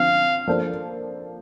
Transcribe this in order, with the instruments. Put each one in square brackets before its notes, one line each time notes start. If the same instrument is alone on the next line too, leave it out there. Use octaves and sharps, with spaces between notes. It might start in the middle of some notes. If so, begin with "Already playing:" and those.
Already playing: [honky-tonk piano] D3 F3 C4 [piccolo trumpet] F5
[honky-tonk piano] F3 A#3 D4 A4 C5